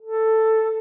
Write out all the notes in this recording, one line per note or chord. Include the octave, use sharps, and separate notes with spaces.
A4